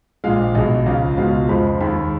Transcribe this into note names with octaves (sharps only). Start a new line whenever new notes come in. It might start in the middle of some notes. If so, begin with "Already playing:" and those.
A#1 A#2 G#3 F5
B1 B2 G#3 D#5
C#2 C#3 F3 F5
C#2 B2 G#3 F5
F2 C#3 F3 G#3 B5
D#2 D#3 G#3 B5